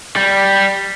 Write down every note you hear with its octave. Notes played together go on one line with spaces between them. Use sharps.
G3